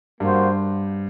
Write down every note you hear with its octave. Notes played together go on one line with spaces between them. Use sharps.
G2 A#3 F#4 C5